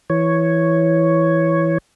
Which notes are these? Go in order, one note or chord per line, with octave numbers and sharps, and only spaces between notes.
E3 C#5